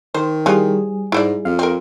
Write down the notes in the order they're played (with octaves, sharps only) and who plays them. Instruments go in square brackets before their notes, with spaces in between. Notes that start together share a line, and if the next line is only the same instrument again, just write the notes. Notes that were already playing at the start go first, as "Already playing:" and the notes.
[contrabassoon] D#3 [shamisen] C5
[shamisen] E3 F3 F4 [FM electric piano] G3 G#4
[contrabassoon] G#2 [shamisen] E4 C5 D5
[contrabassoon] F2 [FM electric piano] F5
[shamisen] C4 A#4